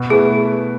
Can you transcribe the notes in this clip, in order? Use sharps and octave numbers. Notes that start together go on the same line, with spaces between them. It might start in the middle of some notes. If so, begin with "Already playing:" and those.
Already playing: B2
A3 E4 G#4 B4